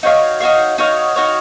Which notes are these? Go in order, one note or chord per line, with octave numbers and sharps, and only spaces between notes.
D#4 F#4 C#5 F5
D#4 F#4 C#5 F5
D#4 F#4 C#5 F5
D#4 F#4 C#5 F5